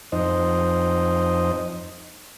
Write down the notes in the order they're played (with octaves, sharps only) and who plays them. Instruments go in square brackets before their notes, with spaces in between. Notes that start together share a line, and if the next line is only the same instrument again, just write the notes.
[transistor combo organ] F2 D#4 C5 D#5